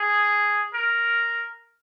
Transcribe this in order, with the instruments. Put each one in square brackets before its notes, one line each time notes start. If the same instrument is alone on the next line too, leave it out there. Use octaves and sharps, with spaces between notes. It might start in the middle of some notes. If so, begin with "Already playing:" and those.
Already playing: [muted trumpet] G#4
A#4